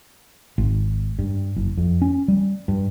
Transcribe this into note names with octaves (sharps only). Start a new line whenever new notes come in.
G#1
G2
F#1
F2
C#4
G3
G2